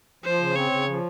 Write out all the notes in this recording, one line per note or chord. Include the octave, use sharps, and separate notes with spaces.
F3 C5
C#3
C4 C#5
C#3
F3